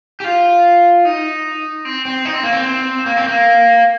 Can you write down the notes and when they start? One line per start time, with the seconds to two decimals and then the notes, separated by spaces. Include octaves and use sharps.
0.20 G4
0.24 F4
1.05 D#4
1.85 C4
2.05 C4
2.25 D#4
2.34 C4
2.43 A#3
2.52 C4
3.06 A#3
3.17 C4
3.28 A#3